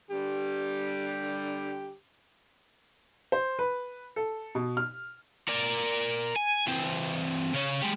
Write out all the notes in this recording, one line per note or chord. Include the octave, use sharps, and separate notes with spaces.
D3 G3 G4
C5
B4
A4
B2
F6
A#4 D5
G#5
E3 C4
C#3 C#4
G#3 G4